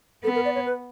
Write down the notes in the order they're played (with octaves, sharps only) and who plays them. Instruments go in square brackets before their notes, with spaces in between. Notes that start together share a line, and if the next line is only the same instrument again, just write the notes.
[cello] B3 [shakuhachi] A4
[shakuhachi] A#4
D5
C#5
B4